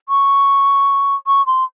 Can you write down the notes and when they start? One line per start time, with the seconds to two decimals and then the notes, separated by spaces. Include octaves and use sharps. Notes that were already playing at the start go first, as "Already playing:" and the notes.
0.09 C#6
1.27 C#6
1.46 C6